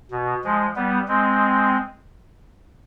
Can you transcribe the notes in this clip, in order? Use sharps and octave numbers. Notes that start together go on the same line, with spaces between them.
B2
F3 G#3
G3 B3
G#3 C4